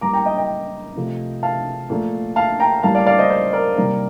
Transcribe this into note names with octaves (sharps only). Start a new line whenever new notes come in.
A2 G3 A#3 A#5 D6
G5 A#5
D#5 G5
D#5 G5
C3 F3 A3
F5 A5
A#2 F3 A3
F5 A5
G5 A#5
A2 G3 A#3 F5 A5
D5 F5
D5 F5
C5 D#5
C5
A#4 D5
C3 D#3 G3 A#3